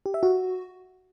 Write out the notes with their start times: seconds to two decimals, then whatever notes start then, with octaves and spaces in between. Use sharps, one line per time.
0.06 G4
0.14 E5
0.23 F#4